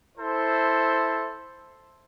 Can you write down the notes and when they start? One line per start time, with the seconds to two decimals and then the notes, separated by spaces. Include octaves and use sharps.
0.18 E4 A4 C5